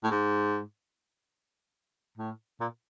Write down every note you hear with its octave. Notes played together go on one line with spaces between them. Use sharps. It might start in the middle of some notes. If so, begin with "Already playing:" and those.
A2
G#2
A2
A#2